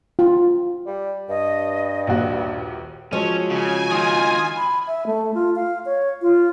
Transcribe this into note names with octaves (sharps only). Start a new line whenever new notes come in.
F4
G3
G2 D#5
A#1 D#2 F#4
F3 F#3 G#3 C#4
C#3 G#5
C#2 D#3 F4 D#6
B5
E5
A3
F4
F5
C#5
F4